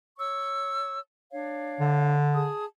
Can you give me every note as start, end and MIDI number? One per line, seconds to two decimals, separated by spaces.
0.18 0.99 73
0.18 0.99 85
0.18 0.99 88
1.32 2.15 62
1.32 2.15 73
1.32 2.15 77
1.80 2.48 50
2.35 2.65 68
2.35 2.65 81
2.35 2.65 87